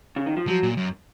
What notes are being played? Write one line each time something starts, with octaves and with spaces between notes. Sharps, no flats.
C#3
D#3
F3
F3 F#3
A#2
F#2